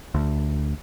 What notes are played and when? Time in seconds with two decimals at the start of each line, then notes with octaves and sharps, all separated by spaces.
0.15 D2